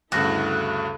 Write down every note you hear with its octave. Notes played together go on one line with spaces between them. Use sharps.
D2 G2 C#3 E4 F#4 A4 F#6